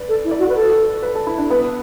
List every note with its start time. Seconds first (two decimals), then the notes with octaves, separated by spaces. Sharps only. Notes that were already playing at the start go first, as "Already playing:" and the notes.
Already playing: B4 D5
0.08 A4
0.24 E4
0.31 D5
0.39 F#4
0.49 B4
0.56 A4
1.02 B4
1.15 A4
1.27 E4
1.38 D4
1.50 B3 B4